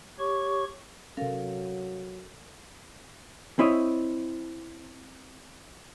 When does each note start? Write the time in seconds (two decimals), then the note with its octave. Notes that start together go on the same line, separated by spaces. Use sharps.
0.19 G4 C#5 C#6
1.17 C3 F#3 C#4 A4 A#4 F5
3.59 C4 E4 C#5 D#5